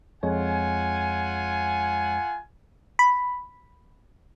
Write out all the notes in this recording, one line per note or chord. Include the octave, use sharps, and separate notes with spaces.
F2 G#3 F4 C#5 F#5 G#5
B5